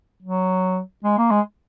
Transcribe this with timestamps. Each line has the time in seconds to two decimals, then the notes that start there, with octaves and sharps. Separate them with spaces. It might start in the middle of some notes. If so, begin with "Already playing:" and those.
0.22 F#3
1.04 G#3
1.18 A#3
1.31 G#3